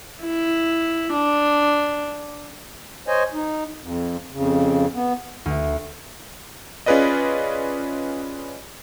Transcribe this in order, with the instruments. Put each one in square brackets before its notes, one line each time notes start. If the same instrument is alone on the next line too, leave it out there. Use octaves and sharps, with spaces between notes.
[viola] E4
D4
[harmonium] C5 C#5 D#5 G#5
D#4
F2
F2 C#3
B3
[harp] D2
[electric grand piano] C#4 F4 G#4 B4 D5 D#5